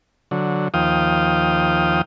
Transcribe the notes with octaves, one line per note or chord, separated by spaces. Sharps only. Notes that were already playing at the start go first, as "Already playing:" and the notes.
D3 F#3
D#2 F3 F5 G5 D#6